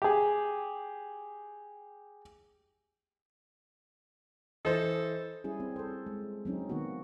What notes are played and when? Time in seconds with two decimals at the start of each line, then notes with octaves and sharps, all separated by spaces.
0.02 G4 G#4
4.65 E3 A4 C5 D#5
5.44 G3 C#4 E4 G#4
5.60 C4
5.76 A4 C5
6.06 G#3
6.45 F#3 C4 C#4 D#4
6.69 D#3 A#3 B3 F#4